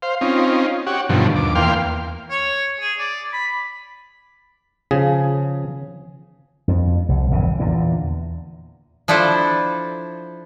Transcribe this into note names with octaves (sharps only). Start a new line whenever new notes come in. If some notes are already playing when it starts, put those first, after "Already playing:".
C5 F5
C4 C#4 D#4 F4
F#4 G4 C#5 F#5
G2 B2 D3 D#3 F3
D#2 D6
E2 A#3 F5 G5 C6 F6
C#5
G#4
D5
B5
C#3 F3 G#4
F2
C2
A#1 E2 G2 C#3
E2 A#2 D3
F3 D4 E4 A4 C5